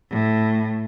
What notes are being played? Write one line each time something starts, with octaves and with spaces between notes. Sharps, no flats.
A2